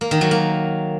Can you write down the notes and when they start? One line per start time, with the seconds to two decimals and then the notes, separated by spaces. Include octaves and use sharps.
0.01 A#3
0.11 D#3
0.21 F#3
0.31 A#3